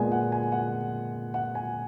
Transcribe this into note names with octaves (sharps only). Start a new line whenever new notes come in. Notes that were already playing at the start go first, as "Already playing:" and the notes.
Already playing: A#2 G#3 B3 G#5
F#5
G#5
F#5
F#5
G#5